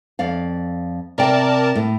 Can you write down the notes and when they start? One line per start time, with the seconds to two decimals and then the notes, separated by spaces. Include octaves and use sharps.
0.19 F2 D5 F5
1.18 C3 A#4 D5 G5 A5
1.75 A2